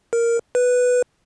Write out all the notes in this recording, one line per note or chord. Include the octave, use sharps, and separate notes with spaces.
A#4
B4